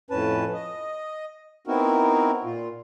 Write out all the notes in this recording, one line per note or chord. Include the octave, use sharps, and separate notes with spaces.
F2 A2 C#4 B4 A5
D#5
B3 C4 D#4 E4 F#4 A#4
A#2 F4